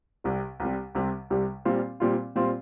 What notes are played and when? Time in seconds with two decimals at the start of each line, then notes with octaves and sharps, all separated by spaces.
0.24 C2 C3 G3
0.60 C2 C3 G3
0.95 C2 C3 G3
1.30 C2 C3 G3
1.65 A#2 G3 C4 F4
2.00 A#2 G3 C4 F4
2.36 A#2 G3 C4 F4